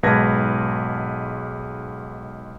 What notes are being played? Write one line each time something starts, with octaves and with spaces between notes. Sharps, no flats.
B1 G#2 B4 A5 G#6 A#6